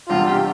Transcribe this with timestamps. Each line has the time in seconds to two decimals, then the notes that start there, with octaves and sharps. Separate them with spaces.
0.09 E2 C3 G3 D4 F4
0.27 G4